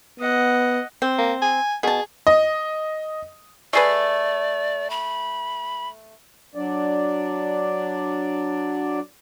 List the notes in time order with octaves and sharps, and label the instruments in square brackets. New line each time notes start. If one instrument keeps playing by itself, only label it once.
[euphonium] B3 [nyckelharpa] D#5 F#5
[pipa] C4
[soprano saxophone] A#3
G#5
[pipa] B2 A5 [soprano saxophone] G#4
[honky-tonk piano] D#5
[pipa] A3 G#4 B4 [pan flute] D5
[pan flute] B5
[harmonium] F#3 D4 D5